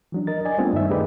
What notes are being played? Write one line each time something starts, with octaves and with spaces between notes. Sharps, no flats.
E3 F#3 D4
A#4 D#5 A6
D5 D#5 G#5
G3 A3 B3 C4 D4 F4
G2 D#3 D#4 E5
A3 D#4 G4 G#4 B4 D5